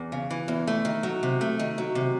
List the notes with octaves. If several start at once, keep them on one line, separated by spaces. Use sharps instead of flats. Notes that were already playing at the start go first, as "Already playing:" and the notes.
Already playing: E2
C#3
E3
E2
A3
D#3
F#3
C3
A3
D#3
F#3
C3